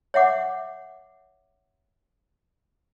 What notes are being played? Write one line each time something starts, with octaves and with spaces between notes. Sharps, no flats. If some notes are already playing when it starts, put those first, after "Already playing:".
C#5 E5 F#5 D6